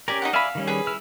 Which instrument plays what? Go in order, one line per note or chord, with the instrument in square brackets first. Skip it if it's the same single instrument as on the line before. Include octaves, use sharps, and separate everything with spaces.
[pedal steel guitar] C#4 G4 A#4 [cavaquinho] D5 G#5 A#5
[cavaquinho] D#4 D#5 F#5
[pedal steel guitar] D5 E5 G#5 [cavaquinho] F5 B5
[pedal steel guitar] D#3 G3 C#4
[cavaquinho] G#4 B4
[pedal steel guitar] E4 E6 F6